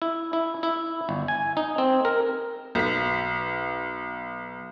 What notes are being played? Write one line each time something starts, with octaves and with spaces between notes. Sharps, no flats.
E4
E4
E4
G1
G#5
D#4
C4
A#4
B1 B6